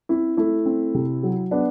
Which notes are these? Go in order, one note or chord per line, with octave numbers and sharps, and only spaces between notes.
C4 E4
A3 E4
C4
C3
F#3
B3 D4